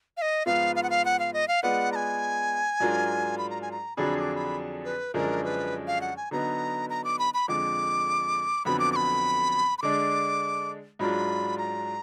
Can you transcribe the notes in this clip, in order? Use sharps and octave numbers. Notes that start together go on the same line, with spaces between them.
F5
D#5
G#2 F3 B3 F4 F5
F5
F#5
F5
F#5
F5
D#5
F5
G#3 B3 F4 B4 D5 F#5
A#5
G#5
G#2 F#3 D4 F4 A#4
B5
A#5
G#5
A#5
F2 D3 F#3 D4 G#4 B5
D#6
D6
B5
B4
F#2 D3 F3 G#3 D4 A#4
B4
F5
F#5
G#5
D3 F#3 B3 D#4 A#5
A#5
D6
B5
B5
F2 D3 F3 G#3 D6
F2 D3 F#3 B3 B5
D6
D6
B5
B5
D3 G#3 D4 D6
G#2 F#3 D4 F4 B5
A#5